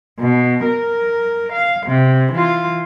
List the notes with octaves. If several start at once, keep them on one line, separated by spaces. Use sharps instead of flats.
B2
A#4
F5
C3
E3 F4